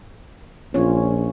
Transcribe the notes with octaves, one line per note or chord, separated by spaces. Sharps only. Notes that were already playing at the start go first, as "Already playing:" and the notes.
A#1 C#4 F4 C#5